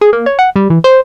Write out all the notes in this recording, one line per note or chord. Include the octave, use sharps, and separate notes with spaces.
G#4
A#3
C#5
F#5
G3
E3
C5